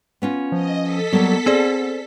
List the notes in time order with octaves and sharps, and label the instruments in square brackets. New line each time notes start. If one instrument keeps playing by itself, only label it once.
[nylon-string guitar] B3 C#4 F4
[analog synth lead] F3 [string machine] D#5
[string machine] A4 B6
[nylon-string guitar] F#3 G3 A#3 [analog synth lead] B3
[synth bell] C4 G#4 D5 [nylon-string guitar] C5